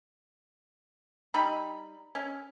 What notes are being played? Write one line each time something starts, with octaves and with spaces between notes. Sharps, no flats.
G3 D#4 B5
C#4